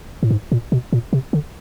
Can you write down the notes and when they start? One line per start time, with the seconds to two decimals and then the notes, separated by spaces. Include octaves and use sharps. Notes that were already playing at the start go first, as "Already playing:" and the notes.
0.23 A2
0.31 G#2
0.52 A#2
0.72 B2
0.93 A#2
1.13 C3
1.33 D3